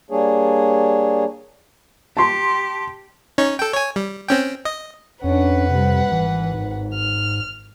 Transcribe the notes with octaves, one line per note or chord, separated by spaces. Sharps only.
G3 A#3 D4 G#4 C#5
G4 A5 C6
C#4 D#4 C#5
A4 G5
C#5 G#5
G3
C4 C#4 G5
D#5
F2 C#4 D4 B4 F#5
C3 G3
G#1 E3
G#2
F6